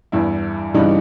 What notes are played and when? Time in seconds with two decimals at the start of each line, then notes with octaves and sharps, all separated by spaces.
0.12 E2 G2 E4
0.74 G2 C#3 E3 G3 D4 D#4